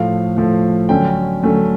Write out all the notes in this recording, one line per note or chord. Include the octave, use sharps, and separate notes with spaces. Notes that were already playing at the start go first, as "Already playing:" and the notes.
Already playing: A2 F3 A3 F5
A2 F3 A3
D3 F#3 A3 C#4 G5
D3 F#3 A3 C#4